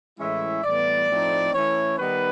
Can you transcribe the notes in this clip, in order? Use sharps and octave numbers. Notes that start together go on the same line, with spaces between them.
A2 E3 G#3 C#4 E4 E5
A2 E3 G3 B3 D5
A2 F3 A3 C4 D#4
E3 A3 C#4 E4 C#5
D#3 G3 B3 D#4 B4